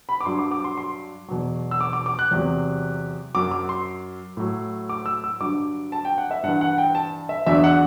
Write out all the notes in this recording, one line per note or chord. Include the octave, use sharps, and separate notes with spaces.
B5
D6
G2 F#3 C6
D6
D6
C6
C6
E2 B2 F#3
E6
D6
D6
D6
F#6
E2 C3 F#3
F#2 F#3 D6
D6
C6
A2 F#3
D6
E6
E6
G2 D3 F#3 D6
A5
G5
F#5
E5
G2 E3 F#5
F#5
G5
A5
E5
E2 D3 F#3 E5
F#5